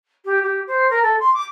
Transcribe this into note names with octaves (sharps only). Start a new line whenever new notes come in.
G4
G4
C5
A#4
A4
C6
D6